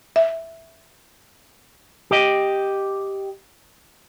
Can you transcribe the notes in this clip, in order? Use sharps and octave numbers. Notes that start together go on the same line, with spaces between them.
E5
G4 D#5